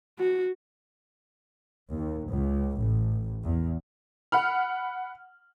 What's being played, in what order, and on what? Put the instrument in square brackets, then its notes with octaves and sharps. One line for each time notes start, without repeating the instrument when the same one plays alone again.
[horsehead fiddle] F#4
[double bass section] D#2
C#2
A1
E2
[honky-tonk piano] F#5 B5 F6